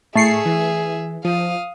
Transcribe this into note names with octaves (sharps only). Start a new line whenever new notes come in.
A2 A3 G#4 E5 C7 C#7
E3
F3 F5 D#6